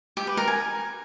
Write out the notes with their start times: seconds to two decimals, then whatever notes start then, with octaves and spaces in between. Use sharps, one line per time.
0.17 G4
0.27 B4
0.37 A#4
0.48 G#5